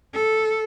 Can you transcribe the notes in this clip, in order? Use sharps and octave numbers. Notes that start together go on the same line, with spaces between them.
A4